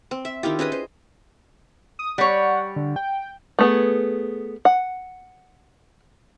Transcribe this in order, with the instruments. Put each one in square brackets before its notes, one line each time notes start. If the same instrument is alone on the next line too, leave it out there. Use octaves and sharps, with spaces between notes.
[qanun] C4
E5
D#3 E4 F4 G4
C#4 G#4 B4 D#5
C5
[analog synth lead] D#6
[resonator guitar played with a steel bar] G3 C#5 [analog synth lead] F#5
[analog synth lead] D3
G5
[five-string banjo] A3 B3 G#4
F#5